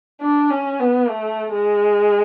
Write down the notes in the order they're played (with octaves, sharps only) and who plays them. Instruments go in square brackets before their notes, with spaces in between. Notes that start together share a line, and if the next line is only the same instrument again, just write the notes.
[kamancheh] D4
C#4
B3
A3
G#3